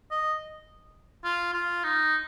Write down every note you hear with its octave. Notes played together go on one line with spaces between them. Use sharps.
D#5
F4
F4
D#4